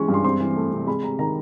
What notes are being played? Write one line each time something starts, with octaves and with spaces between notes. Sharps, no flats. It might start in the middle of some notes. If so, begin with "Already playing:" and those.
Already playing: E3 G#3 C#4 C#6
G2
C6
C4 C6
E3
A3
C3
G#3 B5
C3 A#5
D#3 A#5